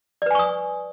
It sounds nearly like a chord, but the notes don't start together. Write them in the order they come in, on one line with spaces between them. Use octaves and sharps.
D5 B4 G#5 C#6 D#6